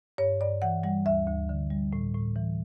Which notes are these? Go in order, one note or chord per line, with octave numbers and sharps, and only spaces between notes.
G2 C#5
G2 D5
E3 F#5
G3 F#5
D2 E5
D2
D3
G3
A2
A2
E3